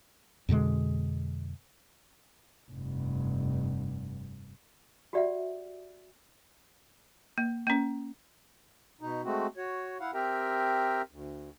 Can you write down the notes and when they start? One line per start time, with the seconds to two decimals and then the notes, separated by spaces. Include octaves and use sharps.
0.49 F2 B2 D3 G#3
2.70 F1 G2
5.13 F#4 G4 D5 E5 F#5
7.38 A#3
7.67 A#3 C#4
9.01 B2 D#4
9.24 G#3 A3 C4 F#4
9.57 F#4 C#5
10.00 E4 F5 F#5
10.14 C4 G4 A#4 E5 G5 A#5
11.11 D2